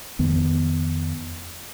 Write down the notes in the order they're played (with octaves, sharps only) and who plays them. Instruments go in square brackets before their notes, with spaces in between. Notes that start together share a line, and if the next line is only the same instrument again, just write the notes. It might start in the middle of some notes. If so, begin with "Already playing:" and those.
[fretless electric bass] F2 D#3 B3